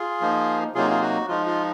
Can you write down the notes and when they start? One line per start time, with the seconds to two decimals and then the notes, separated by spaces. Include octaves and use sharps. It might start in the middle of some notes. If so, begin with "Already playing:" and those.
Already playing: F4 G#4
0.21 F3 A#3 D#4
0.75 C3 F#3 A#3 D#4 F4 G#4
0.91 F4
1.02 F#4
1.28 F3 G#3 D#4 F4
1.46 F4